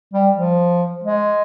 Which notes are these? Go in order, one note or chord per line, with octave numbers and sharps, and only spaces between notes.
G3
F3
G#3